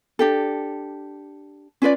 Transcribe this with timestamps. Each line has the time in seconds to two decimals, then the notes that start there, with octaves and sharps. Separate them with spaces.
0.19 D4 G4 A4
1.82 C#4 F4 B4 D5